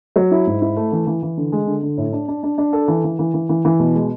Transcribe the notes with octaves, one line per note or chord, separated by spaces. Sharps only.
F#3
E4
G#2
E4
A3
E3
E3
E3
D3
G#3
D3
D3
A2
D4
D4
D4
D4
A4
E3
E3
E3
E3
E3
E3
B2
G#3